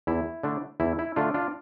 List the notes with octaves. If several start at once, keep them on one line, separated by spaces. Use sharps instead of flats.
E2 E4
D3 A3 D4
E2 E4
E4
D3 A3 D4 F4
D4 F4